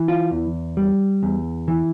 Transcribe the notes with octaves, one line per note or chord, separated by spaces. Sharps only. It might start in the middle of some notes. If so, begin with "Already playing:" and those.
Already playing: E3
F4
E2
G3
E2
E3